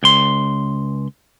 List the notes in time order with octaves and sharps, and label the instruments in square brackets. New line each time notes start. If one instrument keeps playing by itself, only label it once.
[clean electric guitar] C#2 C6